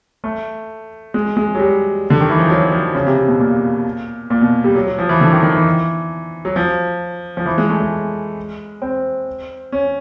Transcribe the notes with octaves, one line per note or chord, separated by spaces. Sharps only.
A3
G#3
G#3
F#3
G3
D3
D#3
E3
F3
F#3
F3
C#3
C3
C3
B2
A#2
A#2
B2
G3
F#3
F#3
F3
E3
D3
D#3
D#3
E3
F#3
F3
F3
E3
G#3
A3
G#3
C4
C#4